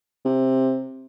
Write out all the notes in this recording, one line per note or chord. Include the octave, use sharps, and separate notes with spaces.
C3